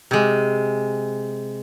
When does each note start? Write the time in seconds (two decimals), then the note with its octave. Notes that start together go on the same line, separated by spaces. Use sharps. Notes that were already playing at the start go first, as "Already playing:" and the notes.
0.11 C3 G#3